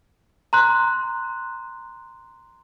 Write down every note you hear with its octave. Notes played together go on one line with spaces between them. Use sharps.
A#5 C6 F#6